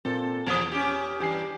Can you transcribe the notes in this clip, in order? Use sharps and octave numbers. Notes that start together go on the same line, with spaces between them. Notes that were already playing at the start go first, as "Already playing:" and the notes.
A#2 A#3 C4 A4
E2 A#2 F3 E4 D#6
C#4 G4
G2 E3 G4 G#5 C7